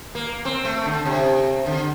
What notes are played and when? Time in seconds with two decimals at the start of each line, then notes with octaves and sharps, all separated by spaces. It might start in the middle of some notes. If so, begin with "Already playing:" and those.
0.15 A#3
0.45 C4
0.65 A3
0.85 D3
1.05 C3
1.66 D3